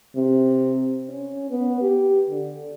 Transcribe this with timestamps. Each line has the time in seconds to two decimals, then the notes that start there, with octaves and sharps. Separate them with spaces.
0.16 C3
1.09 C#4
1.50 B3
1.81 G4
2.30 D3